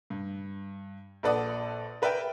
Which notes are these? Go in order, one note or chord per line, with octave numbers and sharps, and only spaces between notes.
G2
A#1 A4 B4 D5 F#5 D#6
A#4 B4 D5 E5 G5